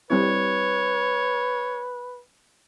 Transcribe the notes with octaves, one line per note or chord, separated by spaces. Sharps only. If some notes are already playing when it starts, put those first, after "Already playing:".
G3 C4 E4 B4 C#5